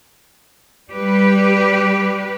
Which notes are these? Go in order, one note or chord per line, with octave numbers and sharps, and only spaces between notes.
G3 G4 B4